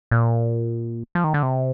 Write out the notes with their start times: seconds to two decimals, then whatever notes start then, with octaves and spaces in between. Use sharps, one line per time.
0.11 A#2
1.15 F3
1.24 D#3
1.34 D3
1.43 C3